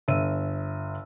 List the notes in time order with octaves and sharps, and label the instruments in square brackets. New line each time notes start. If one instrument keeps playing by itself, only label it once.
[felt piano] G1 E5 E6 D#7